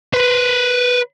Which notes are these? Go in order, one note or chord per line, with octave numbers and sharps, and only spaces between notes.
B4 C5